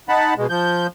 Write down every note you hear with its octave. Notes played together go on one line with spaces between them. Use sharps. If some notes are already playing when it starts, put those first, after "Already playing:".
D#4 F#5 A5 B5
B2 G#3
F3 G6